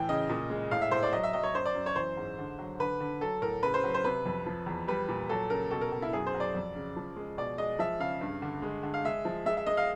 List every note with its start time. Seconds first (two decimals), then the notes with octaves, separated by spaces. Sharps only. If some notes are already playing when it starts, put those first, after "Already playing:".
Already playing: A2 E3 G5
0.09 C#3 D#5
0.29 A#2
0.50 G#3
0.71 A2 F5
0.82 E5
0.91 A2 C5
1.03 D5
1.13 F#3 D#5
1.23 E5
1.33 F#3 D#5
1.43 C#5
1.55 F#2 C5
1.66 D5
1.75 F#2
1.86 C#5
1.96 E3 C5
2.17 G#2
2.38 D3
2.59 F#3
2.79 D3 B4
3.00 D3
3.21 F#3 A4
3.42 A2 A#4
3.63 C#3 B4
3.74 C5
3.84 F#3
3.94 C5
4.04 C3 B4
4.26 F2
4.46 F3
4.66 E2
4.88 G3 B4
5.08 A#2
5.29 F#3 A4
5.50 C#3 A#4
5.71 B2 A4
5.81 A#4
5.92 B2
6.02 E4
6.13 F#2 G#4
6.27 C5
6.34 F#3
6.40 D5
6.55 F2
6.75 C#3
6.96 F3
7.16 G#3
7.38 B2 D5
7.58 G#3 D#5
7.79 F3 E5
8.00 C#3 F5
8.21 G2
8.42 D3
8.62 G#3
8.83 D3
8.94 F5
9.05 G#3 E5
9.25 F3
9.46 G#3 E5
9.57 E5
9.66 G#3 D#5
9.77 F5